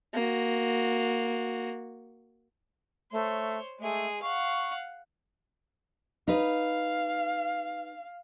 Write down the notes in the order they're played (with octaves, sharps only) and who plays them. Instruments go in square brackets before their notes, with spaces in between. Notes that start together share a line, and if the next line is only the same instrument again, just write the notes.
[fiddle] A#3 F#4
[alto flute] A3 [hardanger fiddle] C5 C#5
[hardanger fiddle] G#3 G#4 [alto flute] A3
[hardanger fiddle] F5 F#5 [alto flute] C#6
[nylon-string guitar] D#4 B4 [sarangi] F5